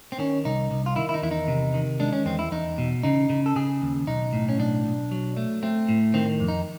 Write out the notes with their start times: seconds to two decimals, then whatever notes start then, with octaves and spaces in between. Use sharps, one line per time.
0.12 C4
0.19 D#3 C#4
0.45 C2 D#4
0.71 C2
0.86 F4
0.96 D#3 E4
1.09 E4
1.14 D#4
1.22 E2 E4
1.31 D#4
1.48 C3
1.74 D#3
2.00 G#3 D4
2.13 C#4
2.26 E2 C4
2.39 E4
2.52 E2 D#4
2.78 B2
3.03 C#3 D#4
3.30 C#3
3.46 A4
3.56 C#3 G#4
3.82 D#2
4.07 B1 D#4
4.33 A2
4.49 C#4
4.59 B1 D4
4.86 B1
5.11 F#3
5.37 A3
5.63 A3 C4
5.89 A2
6.14 D#3 C4
6.40 F2
6.48 D#4